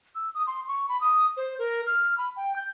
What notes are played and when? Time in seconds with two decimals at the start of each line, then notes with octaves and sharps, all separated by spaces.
0.15 E6
0.35 D#6
0.47 C6
0.68 C#6
0.89 B5
1.01 D#6
1.37 C5
1.59 A#4
1.86 F6
2.18 B5
2.37 G5
2.56 G6